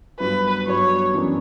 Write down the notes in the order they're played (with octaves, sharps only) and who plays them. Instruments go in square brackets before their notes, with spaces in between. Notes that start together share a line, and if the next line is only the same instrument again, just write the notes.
[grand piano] G2 F#3 B3 F#4 [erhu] B4
[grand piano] G2 F#3 B3 F#4 [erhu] C#5
[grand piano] F#2 E3 B3 D4